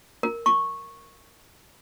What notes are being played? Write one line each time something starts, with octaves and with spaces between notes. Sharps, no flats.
A#4
C#6